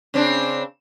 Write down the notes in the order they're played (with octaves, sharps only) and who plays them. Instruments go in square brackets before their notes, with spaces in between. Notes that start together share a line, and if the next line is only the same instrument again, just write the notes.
[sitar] C#3 C4 D4